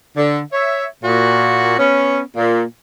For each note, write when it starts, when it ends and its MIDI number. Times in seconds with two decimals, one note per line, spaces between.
0.17 0.40 50
0.53 0.86 73
0.53 0.86 76
1.04 1.74 46
1.04 1.74 66
1.79 2.21 59
1.79 2.21 61
2.37 2.64 46